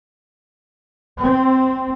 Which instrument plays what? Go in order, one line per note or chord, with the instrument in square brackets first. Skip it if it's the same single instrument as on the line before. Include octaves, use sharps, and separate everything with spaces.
[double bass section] C4